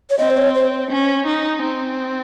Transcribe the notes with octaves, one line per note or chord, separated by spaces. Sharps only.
C#5
C4 D#5
C5
C#5
C5
C#4
D#4
C4